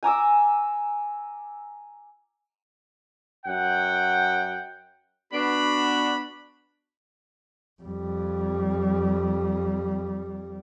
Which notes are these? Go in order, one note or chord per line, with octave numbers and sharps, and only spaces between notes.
G#5 A#5 D6 E6
F#2 F#5 G5
B3 D4 F#4 B5
F2 G3